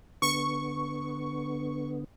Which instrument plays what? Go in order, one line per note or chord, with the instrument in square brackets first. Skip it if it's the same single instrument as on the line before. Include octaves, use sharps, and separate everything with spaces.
[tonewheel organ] D3 B3 [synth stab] C#6